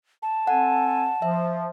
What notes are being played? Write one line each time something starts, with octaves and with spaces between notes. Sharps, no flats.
A5
C4 A4 F#5 G#5
F3 E5